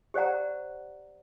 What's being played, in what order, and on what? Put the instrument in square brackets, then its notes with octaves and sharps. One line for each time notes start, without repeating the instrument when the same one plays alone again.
[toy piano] G4 C5 D5 F#5 A#5